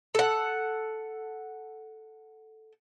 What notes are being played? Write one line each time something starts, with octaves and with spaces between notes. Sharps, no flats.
A4 F#5